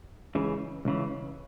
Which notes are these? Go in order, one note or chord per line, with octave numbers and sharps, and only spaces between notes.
C#2 C#3 E3
C#2 C#3 E3